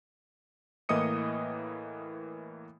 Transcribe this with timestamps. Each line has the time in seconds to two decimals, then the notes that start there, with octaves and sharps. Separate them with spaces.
0.89 A2 E3 A#3 D#5 D#6 C#7